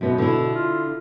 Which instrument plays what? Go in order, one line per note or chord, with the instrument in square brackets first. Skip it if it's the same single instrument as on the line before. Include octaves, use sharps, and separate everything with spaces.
[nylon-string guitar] F#2 B3 D#4 [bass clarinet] B2
[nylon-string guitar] D3 E4
[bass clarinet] F4